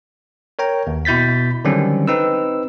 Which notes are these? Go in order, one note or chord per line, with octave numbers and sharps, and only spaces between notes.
A#4 C#5 G5 A#5
D#2
B2 E4 G6 A6 B6
D3 D#3 F#3 G3 C4 C#4
C4 D#4 B4 E6